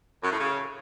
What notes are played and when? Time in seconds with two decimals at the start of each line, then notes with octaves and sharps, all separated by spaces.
0.23 F#2
0.31 A2
0.39 C#3